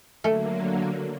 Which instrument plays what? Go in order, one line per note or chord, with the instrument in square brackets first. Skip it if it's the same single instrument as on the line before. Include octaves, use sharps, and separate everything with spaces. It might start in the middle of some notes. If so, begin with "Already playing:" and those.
[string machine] D3 F#3 A#3 [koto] A3